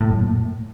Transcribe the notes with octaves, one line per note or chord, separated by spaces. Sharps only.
A2
F#2
A#2